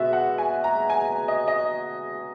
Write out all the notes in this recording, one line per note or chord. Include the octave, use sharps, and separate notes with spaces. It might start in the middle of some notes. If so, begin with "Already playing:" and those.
Already playing: B2 G#3 B3 F#4 E5
F#5
G#5
A#5
G#5
D#5
D#5